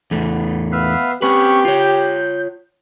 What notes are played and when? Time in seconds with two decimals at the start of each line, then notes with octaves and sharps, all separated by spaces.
0.11 E2 A3 B3
0.72 B3 B4 E5 F5
1.22 C4 C#4 G4 B4 C#6
1.65 F4 C#5 G6